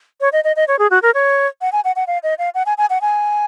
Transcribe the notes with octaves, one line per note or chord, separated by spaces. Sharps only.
C#5
D#5
D#5
D#5
C#5
G#4
F#4
A#4
C#5
F#5
G#5
F#5
F#5
F5
D#5
F5
F#5
G#5
G#5
F#5
G#5